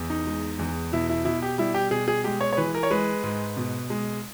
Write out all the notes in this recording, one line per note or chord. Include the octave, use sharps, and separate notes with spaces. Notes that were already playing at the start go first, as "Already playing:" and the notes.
Already playing: E2
D#4
G#3
E2
B2 E4
E4
B2 E4
G4
G3 E4
G4
B2 G#4
G#4
G#3 G4
C#5
C#5
E3 B4
A#4
C#5
G#3 B4
G#2
B2
G#3